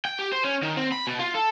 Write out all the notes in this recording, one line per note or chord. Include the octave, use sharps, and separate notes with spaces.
G5
G4
C5
C#4
D#3
C4
B5
B2
F4
A4